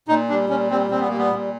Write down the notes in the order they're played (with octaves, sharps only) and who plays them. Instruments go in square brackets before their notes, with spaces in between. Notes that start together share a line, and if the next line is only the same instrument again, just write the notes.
[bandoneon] A#2 D#4
G3 D4
A#2 C#4
G3 C4
A#2 C4
B3
G3 A#3
B3
A#2